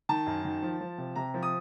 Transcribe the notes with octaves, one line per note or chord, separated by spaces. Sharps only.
D#3 A5
F#2
D#3
F3
F3
C3
C3 A#5
F3
D#6